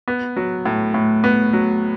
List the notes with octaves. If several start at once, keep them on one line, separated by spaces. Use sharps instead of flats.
B3
F#3
A2
A2
B3
F#3